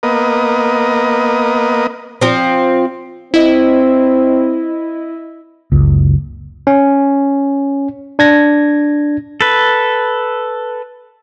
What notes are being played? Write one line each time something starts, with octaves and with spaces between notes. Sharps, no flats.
A#3 B3 D#5
F3 C4
C4 E4 D#5
F#1 C#2
C#4
D4 G#6 A#6
A4 B4